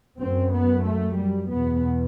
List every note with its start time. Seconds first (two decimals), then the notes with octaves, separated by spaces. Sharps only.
0.20 F#2 C4
0.53 B3
0.85 A3
1.18 G3
1.50 E2 B2 B3